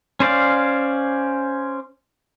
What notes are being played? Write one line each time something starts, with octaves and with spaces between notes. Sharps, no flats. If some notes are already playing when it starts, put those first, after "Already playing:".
C#4 C5 D5 F5